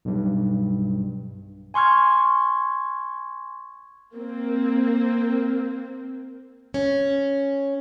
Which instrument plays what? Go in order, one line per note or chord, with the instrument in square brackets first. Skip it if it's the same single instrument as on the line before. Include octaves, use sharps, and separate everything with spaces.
[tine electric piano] B1 G2
[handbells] G#5 C6 C#6 F6 G#6
[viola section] A#3 C4
[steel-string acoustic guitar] C#4